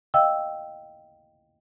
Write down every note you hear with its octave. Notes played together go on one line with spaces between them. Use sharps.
D#5 F5 G5 E6